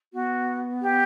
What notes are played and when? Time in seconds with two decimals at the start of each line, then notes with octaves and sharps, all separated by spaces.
0.13 B3 F#4
0.82 G4